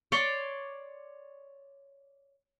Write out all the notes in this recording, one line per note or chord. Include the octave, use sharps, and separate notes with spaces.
C#5 D5 C6 D6